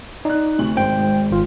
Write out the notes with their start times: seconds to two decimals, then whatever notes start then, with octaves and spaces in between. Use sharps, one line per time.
0.25 D#4 D5 F#6
0.59 D2 C3 F#7
0.77 G#1 G#2 C5 G5
1.31 G#1 F4